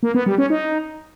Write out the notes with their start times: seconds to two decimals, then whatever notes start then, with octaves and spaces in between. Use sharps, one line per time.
0.03 A#3
0.15 B3
0.26 G3
0.38 C#4
0.50 D#4